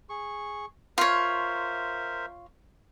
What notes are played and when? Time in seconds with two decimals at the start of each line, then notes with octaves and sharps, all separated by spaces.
0.09 G#4 C#6
0.98 F4 A#4 C5 C#5 E5